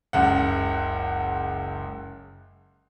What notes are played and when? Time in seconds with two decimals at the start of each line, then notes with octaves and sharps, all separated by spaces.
0.13 F#1 C#2 F#5